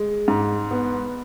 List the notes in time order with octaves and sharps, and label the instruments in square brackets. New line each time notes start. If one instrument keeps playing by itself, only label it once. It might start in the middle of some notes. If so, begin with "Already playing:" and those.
Already playing: [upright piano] G#3
G#2
B3